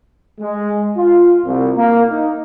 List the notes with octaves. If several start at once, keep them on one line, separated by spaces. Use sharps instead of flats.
G#3
F4
C2
A#3
D#4